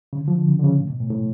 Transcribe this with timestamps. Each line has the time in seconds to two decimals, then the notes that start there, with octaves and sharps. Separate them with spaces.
0.13 C#3
0.18 D3
0.28 F3
0.38 D3
0.48 C#3
0.59 D3
0.64 C#3
0.79 A2
0.90 B2
1.00 A2
1.10 A2